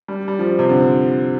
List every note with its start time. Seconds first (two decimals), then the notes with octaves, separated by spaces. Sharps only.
0.08 G3
0.28 G3
0.39 F3
0.59 C3
0.69 D3